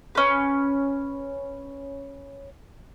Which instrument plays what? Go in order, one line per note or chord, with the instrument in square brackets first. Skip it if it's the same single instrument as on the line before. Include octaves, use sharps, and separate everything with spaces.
[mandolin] C#4 B4